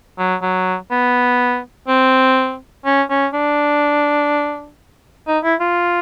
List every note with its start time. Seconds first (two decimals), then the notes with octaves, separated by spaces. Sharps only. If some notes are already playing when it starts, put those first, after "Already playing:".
0.18 F#3
0.42 F#3
0.91 B3
1.88 C4
2.85 C#4
3.10 C#4
3.34 D4
5.27 D#4
5.44 E4
5.60 F4